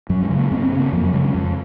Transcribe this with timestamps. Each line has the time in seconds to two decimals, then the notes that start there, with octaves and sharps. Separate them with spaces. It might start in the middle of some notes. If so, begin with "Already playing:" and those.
0.09 F#2 F#3
0.23 G#3
0.30 C#3
0.38 A#3
0.51 F#2 C4
0.65 C4
0.72 C#3
0.79 A#3
0.93 F2 F3
1.03 F#3
1.13 C#3 G#3
1.24 G#3
1.34 F2